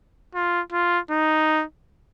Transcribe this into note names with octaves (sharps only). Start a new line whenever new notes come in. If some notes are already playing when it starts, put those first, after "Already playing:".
F4
F4
D#4